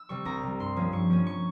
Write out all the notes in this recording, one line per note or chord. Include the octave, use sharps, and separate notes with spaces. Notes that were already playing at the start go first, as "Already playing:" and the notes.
Already playing: E6
C3 G3 C#6
C2 A#5
C3 G3
G2 C6
F3 A#3 C#4
G2 C#6
F3 A#3 C#4
C#6